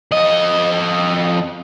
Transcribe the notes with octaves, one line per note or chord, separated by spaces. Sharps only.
F2 D#5